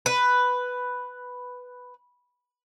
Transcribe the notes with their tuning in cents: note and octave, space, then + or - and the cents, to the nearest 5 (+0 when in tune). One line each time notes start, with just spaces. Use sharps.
B4 +5